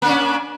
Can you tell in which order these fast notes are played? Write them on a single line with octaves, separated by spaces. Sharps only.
A#3 D4 C#4